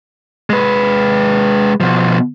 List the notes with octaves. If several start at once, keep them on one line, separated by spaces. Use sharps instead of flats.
G#3 B4
B2 F3